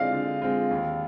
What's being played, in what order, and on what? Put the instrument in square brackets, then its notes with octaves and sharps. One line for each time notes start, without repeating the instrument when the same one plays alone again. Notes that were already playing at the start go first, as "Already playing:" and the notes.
Already playing: [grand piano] D3 G#3 C4 F4 [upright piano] D5 D#5 F5
[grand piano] D3
G#3 C4 F4
D#2